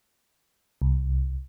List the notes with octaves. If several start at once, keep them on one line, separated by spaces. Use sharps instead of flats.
C2